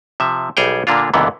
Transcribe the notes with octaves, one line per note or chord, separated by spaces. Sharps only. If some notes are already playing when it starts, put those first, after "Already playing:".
C3 F3 E5
B1 G3 G#4 C#5 G5
A#2 D3 A#3 D4 F4
C#2 F#2 A#2 D3 E3 B3